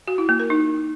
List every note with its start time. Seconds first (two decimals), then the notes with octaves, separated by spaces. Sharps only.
0.08 F#4
0.18 E4
0.29 A#3
0.39 A#4
0.50 D#4